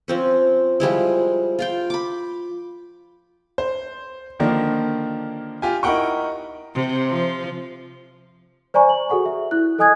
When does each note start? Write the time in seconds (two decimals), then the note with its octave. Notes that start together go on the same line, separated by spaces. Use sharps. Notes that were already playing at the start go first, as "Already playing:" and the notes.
0.08 F3 C4 C#4
0.80 F3 G3 G#3 E4
1.59 F4 F5 G5
1.90 B5 D6
3.58 C5
4.39 D3 D#3 F3 A#3 D4
5.62 F4 G4 G#5
5.83 D#4 E4 A#4 F#5 G5 C#6
6.75 C3
7.09 F3
8.74 C5 D5 G#5 A#5 C#6
8.89 F#7
9.10 F#4 G#4 A4 F#5 C#6
9.26 E5
9.51 E4 F#6
9.79 A4 D#5 G#5 D#6 F#6 G#6